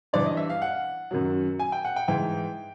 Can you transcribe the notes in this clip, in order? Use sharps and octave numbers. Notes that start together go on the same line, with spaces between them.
G2 E3 D5
D#5
E5
F5
F#5
F#2 D#3 F#3
G#5
G5
F#5
G5
G#2 E3 G5